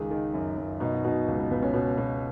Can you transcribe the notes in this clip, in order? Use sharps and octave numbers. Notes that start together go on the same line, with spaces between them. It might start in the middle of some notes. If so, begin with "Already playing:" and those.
Already playing: C#2 D#3 G#4
D#3
F#2
F#2
B2 D#4
F#4
B2 D#4
C#2
B3
C#2 B3
C#4
B2
B2